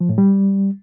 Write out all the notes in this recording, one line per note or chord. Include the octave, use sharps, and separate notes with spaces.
F3
A2
G3